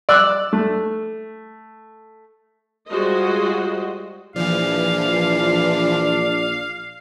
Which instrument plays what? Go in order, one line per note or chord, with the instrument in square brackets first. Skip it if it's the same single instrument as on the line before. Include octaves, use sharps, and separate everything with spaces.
[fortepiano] D5 E6 F#6
A3
[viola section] G3 G#3 F4 F#4 C5 D#5
[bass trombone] A#1 [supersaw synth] E3 F3 [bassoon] D4 [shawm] F5